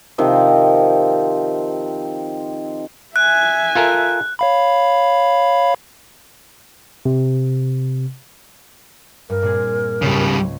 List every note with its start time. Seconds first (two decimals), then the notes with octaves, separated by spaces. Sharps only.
0.18 C3 D#3 F3 C4
3.16 E5 G#5 F#6
3.75 F4 A4 A#4
4.39 C#5 F5 B5
7.05 C3
9.30 G2 A#4
9.42 A#2 C4 G#4
10.02 C#2 G#2 C#3 G3